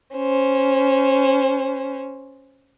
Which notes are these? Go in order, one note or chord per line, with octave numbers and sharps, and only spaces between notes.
C#4 C5